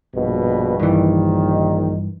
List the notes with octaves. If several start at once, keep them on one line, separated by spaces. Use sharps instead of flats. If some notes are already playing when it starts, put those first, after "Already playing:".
A#1 G2 B2
A#1 G2 D#3 E3